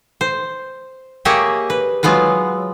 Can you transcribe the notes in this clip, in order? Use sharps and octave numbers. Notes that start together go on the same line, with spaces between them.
C5
A#3 G4 G#4 C#5 D#5 E5
B4
F#3 G#3 B3 F4 B4